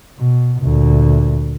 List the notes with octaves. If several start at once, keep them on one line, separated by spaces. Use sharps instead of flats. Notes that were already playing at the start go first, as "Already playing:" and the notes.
B2
D2 A#2